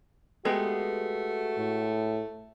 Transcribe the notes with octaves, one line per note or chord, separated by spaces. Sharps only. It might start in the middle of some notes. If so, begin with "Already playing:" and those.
G#3 A3 B3 F#4 G4
A2